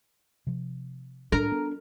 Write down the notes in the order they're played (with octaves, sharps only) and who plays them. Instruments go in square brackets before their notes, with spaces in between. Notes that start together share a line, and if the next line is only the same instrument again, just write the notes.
[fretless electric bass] C3 F3
[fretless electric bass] A2 [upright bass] D4 [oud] A#4
[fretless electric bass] B3